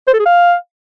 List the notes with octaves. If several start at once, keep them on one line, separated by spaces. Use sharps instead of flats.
C5
A4
G#4
F5